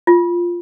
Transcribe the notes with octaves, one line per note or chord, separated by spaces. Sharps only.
F4